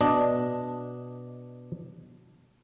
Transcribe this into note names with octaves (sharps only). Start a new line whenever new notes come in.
B2 D4 D#5